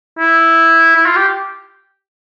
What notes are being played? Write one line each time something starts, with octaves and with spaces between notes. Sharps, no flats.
E4
E4
F4
G4